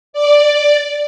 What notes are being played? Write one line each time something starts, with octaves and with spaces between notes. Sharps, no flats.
D5